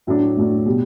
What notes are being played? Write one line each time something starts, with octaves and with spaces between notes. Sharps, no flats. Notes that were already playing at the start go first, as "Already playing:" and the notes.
A2 F#3 A3 D4
A2 F#3 A3 D4
B2 G3